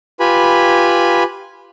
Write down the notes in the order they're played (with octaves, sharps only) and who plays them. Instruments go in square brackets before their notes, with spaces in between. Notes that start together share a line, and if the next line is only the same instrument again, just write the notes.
[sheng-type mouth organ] F4 G4 B4 G#5 B5